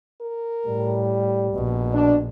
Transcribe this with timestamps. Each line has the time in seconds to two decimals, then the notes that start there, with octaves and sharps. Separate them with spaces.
0.21 A#4
0.68 A2 G3
1.55 A#1 B2
1.93 D4